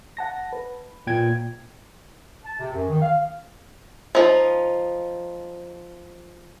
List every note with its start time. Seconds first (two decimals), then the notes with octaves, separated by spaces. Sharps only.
0.17 F#5 A5 A#6
0.53 B4
1.07 A#2 G5 G#6
2.44 A5
2.59 C3
2.74 F#2
2.89 D#3
3.02 F5
4.15 F3 D#4